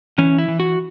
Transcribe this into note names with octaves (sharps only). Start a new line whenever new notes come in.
E3 C#4
E4
E3
F#4